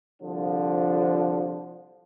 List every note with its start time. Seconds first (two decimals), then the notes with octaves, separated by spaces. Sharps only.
0.22 C2 D3 F3